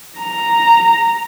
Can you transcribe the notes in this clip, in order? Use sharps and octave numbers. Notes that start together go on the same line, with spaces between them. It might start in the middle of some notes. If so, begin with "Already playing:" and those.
A#5